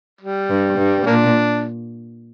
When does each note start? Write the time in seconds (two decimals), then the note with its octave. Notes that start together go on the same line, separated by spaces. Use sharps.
0.21 G3
0.50 G2
0.78 G2
1.06 A#2 A#3 D4